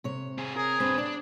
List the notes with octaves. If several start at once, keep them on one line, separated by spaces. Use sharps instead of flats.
C3 C#5
C4 G#4
G#4 A#4
C4 D4 B4
D4 D5